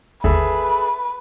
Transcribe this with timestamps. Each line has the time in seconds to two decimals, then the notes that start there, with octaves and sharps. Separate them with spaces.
0.24 G1 D#2 G#4 A4 B4 E5